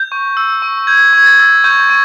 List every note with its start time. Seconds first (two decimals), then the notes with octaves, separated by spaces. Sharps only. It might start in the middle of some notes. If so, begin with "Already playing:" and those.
Already playing: G6
0.12 C#6
0.37 E6
0.62 C#6
0.87 G6 G#6
1.13 C#6 G#6
1.26 A6
1.39 E6
1.64 C#6 G6
1.90 C#6